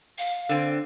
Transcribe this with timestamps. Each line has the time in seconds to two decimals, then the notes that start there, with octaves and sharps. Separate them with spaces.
0.18 F5
0.49 D3 C4